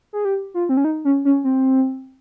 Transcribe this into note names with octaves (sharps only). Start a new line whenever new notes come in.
G#4
G4
F4
C4
C#4
D#4
C#4
C#4
C4